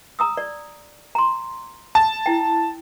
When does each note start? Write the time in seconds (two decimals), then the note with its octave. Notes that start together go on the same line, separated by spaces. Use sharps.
0.19 A#5 D#6 E6
0.37 D5
1.15 A#5 C6
1.95 A5
2.26 E4 G5